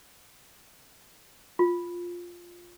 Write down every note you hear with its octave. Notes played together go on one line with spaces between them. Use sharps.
F4